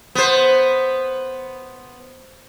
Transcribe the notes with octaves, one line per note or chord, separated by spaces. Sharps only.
B3 C5